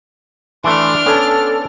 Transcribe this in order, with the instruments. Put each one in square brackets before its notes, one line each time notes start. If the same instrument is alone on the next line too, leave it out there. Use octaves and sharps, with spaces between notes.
[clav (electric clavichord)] E3 A3 [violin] D4 F6 [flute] C6
[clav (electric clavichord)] B3 C#4 [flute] A4